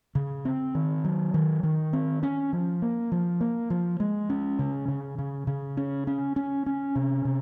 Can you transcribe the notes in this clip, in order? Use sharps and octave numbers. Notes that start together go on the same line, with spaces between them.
C#3
C4
D#3
F#3
D#3
D#3
C4
C#4
F3
A#3
F3
A#3
F3
G#3
C#4
C#3
C#3
C#3
C#3
C#4
C#4
C#4
C#4
C3
C3